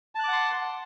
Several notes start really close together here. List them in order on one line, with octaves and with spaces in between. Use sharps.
A5 F#6 D6 F#5 C6